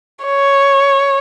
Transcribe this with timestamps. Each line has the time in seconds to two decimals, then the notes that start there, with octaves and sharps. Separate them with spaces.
0.25 C#5